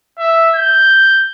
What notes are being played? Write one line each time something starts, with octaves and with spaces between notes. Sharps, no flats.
E5
G6